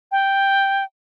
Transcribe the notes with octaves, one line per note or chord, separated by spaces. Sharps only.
G5